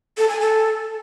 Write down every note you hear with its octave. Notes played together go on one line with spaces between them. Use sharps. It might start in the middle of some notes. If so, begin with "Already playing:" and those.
A4
G#5
A4